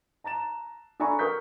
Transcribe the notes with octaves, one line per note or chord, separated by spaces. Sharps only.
A5 A#5 A6 E7
D4 A4 G#5 A#5 B5 C#6
A#4 C#6 D#6 G6 B6